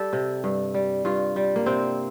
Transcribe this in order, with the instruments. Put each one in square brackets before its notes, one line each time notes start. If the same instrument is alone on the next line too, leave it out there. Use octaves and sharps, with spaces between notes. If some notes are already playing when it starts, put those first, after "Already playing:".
Already playing: [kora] G3 G4 A4
C3
G2
G3
G2 F4
G3
A#3
C3 C4